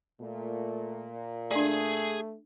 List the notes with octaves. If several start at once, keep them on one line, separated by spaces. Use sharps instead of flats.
A#2 A3
A3 D4 G#4 D5 G#5